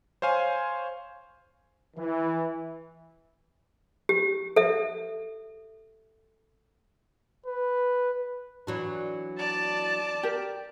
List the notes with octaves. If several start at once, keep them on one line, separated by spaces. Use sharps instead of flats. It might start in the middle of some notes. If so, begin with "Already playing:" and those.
C5 C#5 F5 G#5
E3
G4
A4 E5
B4
E3 F#3 D4
D5 A5
G4 A#4